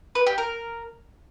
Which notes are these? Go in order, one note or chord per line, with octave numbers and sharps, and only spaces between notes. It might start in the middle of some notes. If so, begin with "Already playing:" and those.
B4
G4
A#4